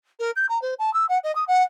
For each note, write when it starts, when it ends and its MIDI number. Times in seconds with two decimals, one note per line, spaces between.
0.20 0.31 70
0.36 0.46 91
0.49 0.61 82
0.62 0.74 72
0.79 0.93 81
0.94 1.06 88
1.09 1.18 78
1.24 1.34 75
1.36 1.44 87
1.48 1.63 78